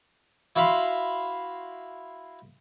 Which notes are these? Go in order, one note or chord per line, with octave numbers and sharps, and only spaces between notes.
E4 F#4 E5 F5 B5 C6